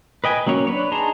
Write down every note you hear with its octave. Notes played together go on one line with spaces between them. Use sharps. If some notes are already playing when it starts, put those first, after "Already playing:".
B4 D#5 G5 G#5
F#3 A#3 C#4 C#5
D4 B4 C#5
D#4 G#4 A5 A#5 C6